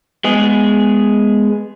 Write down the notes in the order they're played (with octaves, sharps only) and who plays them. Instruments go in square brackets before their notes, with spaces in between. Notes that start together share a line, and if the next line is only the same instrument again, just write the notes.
[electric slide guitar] G#3 B3 G#4